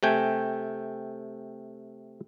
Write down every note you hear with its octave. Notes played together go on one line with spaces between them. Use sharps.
C3 A3 G5 G#5